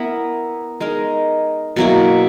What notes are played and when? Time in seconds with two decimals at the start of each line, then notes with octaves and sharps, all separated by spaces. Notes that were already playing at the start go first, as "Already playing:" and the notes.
Already playing: B3 E4 A#4 E5
0.80 G#3 D#4 A#4
1.76 B2 F#3 A#3 E4